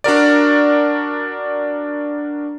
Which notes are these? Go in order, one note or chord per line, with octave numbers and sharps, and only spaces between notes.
D4 F#4 A#4 D5